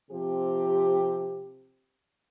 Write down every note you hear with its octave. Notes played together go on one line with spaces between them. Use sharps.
C3 F3 C4 G4